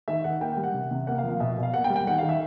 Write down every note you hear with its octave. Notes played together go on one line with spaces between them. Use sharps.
D#3 E5
D#3 F#5
A#3 G5
G5
G3
F#5
C3
C3
A#3 F#5
F5
F3
F5
B2 E5
B2
F5
A#3 F#5
G5
G3
G5
D#3 F#5
F5
D#3
E5